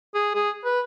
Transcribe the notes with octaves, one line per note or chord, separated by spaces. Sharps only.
G#4
G#4
B4